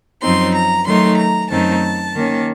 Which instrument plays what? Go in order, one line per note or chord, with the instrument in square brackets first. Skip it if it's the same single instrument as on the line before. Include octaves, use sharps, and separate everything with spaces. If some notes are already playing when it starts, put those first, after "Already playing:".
[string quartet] F#2 F3 C4 D#4 C6
A#5
D#3 F#3 A3 D#4 C6
A#5
F#2 D#3 A3 C4 D#4 A5
D#3 A#3 C#4